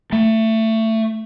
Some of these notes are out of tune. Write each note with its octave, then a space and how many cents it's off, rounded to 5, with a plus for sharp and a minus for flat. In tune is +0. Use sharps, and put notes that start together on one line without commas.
A3 +20